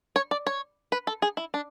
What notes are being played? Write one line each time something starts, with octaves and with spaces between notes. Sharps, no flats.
C#5
D5
C#5
B4
A4
G#4
E4
D4